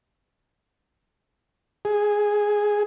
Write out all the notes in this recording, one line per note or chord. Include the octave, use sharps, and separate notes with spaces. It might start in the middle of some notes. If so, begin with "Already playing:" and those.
G#4